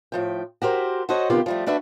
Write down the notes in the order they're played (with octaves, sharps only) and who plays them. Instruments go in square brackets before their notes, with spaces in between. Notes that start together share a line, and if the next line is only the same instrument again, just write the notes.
[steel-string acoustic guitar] A2 F3 G5
F#4 G4 A#4 C5
F#4 A4 C5 C#5 D#5 F#5
C3 D#3 B3 F4 G4
F3 G3 A3
A3 D4 F#4 B4 E5